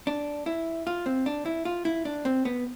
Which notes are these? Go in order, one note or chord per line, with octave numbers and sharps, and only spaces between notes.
D4
E4
F4
C4
D4
E4
F4
E4
D4
C4
B3